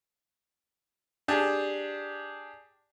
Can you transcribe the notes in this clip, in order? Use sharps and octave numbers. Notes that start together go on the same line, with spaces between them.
D4 G4 G#4 A5